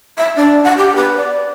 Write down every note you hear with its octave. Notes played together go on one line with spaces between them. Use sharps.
E5
D4
F#5
G4
B4
D5